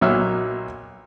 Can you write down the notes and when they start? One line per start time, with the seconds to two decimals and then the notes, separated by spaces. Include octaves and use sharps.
0.01 B1 A#2 F#3 E5 F6